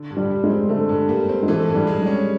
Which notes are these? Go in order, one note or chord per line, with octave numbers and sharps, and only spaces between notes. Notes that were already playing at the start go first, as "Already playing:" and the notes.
Already playing: D3
G2
G3
G3
G#3
C4
D3 A3
G2
G3 A#3
C4
G#3
E3 A3
G2
G3
G#3
G3
C#4